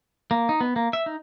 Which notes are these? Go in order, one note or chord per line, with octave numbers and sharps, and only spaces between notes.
A#3
D#4
B3
A#3
E5
D#4